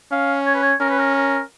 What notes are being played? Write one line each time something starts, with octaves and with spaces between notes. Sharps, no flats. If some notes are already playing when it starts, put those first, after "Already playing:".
C#4 F5
C#5
B4
C#5
C#4 A#4
B4
A#4
A#4